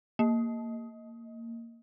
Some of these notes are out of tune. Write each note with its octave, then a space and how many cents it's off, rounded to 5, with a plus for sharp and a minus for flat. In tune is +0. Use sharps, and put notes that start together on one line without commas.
A#3 -15